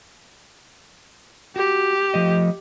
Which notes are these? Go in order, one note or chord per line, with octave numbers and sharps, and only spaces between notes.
F#4 G4
F3 A3 D#5